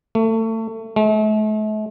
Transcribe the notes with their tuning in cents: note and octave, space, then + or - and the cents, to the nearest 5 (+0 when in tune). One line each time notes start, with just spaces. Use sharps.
A3 +30
A3 -40